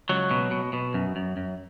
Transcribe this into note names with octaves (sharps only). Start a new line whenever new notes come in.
C#2 F#3
B2
B2
B2
F#2
F#2
F#2